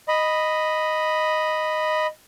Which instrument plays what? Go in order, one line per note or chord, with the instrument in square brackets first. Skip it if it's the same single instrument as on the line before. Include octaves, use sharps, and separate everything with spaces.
[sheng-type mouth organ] D#5 B5